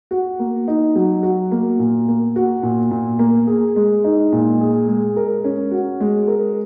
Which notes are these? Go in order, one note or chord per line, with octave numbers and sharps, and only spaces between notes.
F#4
A#3
D#4
F#3
F#4
A#3
A#2
A#3
F#4
A#2
A#2
A#3
G#4
G#3
D#4
A#2
G#4
G#3
A#4
C#4
F#4
G#3
A#4